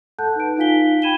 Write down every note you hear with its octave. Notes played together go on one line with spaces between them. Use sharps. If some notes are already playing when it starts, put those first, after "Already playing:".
A4 F#5 A5 F#6 G6
D#4 B4 D7
D#4 F4 F5 G#5 B6 G7
G5 B5 G#6 D#7 E7 G7